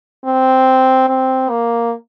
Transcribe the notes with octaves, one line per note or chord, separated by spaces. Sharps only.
C4
C4
A#3